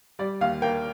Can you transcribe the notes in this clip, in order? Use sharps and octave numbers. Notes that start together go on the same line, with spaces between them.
G3 D5
D#2 F5
A#3 G5